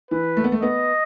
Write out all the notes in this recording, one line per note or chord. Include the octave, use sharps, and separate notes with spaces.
E3 B4
A3
B3
A3
B3 D#5